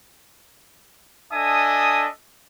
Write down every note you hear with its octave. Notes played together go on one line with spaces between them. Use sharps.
D4 A4 D#5 E5 G#5 D#6